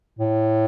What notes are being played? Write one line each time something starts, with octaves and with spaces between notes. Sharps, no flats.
A2